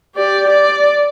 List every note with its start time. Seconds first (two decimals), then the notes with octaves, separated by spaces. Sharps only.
0.15 G4 D5
0.50 D5